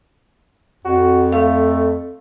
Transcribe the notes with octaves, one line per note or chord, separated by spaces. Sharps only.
F2 F#4
A3 F5